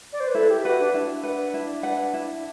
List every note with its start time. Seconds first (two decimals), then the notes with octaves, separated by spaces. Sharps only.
0.12 D5
0.20 C5
0.28 B4
0.35 E4 A4
0.50 G4
0.65 F#4 B4 F#5
0.80 D4
0.94 D4 E4
1.24 B4 F#5
1.54 E4
1.83 B4 F#5
2.14 E4